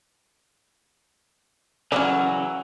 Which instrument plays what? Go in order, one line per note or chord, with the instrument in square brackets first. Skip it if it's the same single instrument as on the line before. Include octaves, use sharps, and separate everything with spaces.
[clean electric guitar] C#3 E3 F#3 [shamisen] C#4 F#4 D5